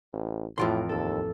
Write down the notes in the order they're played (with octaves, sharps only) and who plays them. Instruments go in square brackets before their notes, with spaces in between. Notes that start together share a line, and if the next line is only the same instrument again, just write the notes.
[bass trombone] A1
[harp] A1 D7 [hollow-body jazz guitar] F2 F4 C6 [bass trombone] A2
[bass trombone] D#2 [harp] A4 E6